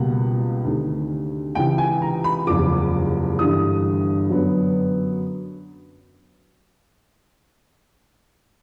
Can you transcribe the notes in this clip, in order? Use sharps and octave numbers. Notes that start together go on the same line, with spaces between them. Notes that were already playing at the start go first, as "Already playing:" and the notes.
Already playing: C#2 B2 G3 A#3 F#5
D2 C3 D#3
C#2 C3 E3 G5
G#5
A#5
B5
F#1 E2 C3 F3 G#3 D6
G1 G2 E3 G3 D#6
F#2 D3 F#3 B3